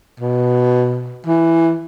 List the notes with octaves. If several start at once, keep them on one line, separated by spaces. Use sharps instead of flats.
B2
E3